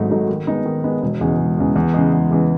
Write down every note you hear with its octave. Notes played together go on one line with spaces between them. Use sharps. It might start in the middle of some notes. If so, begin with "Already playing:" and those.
Already playing: G#1 G#2 F#3 A3 D#4
G#2 F#3 A3 D#4
D#3
G#3 B3 D#4
D#3
G#3 B3 D#4
E1
E2 C#3 G#3
E1
E2 C#3 G#3
E2
C#3 E3 G#3
E2
C#3 E3 G#3